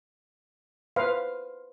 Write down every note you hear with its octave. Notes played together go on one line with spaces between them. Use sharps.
B4 C5 F5